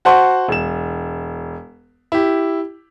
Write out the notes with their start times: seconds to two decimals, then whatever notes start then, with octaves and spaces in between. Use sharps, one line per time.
0.05 F#4 C5 F#5 A5 C6 C#6
0.48 E1 E7
2.12 E4 G4